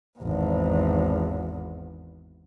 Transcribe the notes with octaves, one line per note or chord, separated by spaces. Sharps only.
G#1 E2